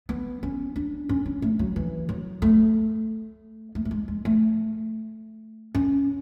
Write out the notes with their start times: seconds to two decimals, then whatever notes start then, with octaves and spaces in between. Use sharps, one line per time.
0.09 B3
0.43 C#4
0.76 D4
1.09 C#4
1.26 C#4
1.42 A3
1.59 F#3
1.76 E3
2.09 F#3
2.42 A3
3.75 A3
3.85 A3
3.91 G#3
4.08 G#3
4.25 A3
5.75 C#4